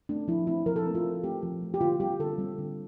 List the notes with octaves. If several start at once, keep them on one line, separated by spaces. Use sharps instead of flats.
A3 C4 D4
F3 E4
A3 C4 E4
F3 A#4
A4
A3 C4
F4
F3
A3 C4 G4
F3
A3 C4
G4
D3 F4
G3 C4 G4
D3 A4
G3 C4
D3